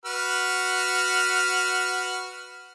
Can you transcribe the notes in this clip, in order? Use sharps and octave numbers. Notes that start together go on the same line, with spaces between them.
F#4 B4 F6